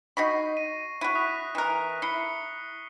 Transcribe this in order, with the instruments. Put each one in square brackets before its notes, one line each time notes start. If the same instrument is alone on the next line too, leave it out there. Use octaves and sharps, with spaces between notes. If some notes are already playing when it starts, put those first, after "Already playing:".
[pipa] D#4 F#4 B5 [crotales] C#6 A#6 C7
[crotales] D#7
[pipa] E4 F#4 [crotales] D#7
[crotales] D#6 F#6 B6
[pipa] E3 A#4 [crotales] F#6
[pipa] E4 [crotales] C7 C#7 G7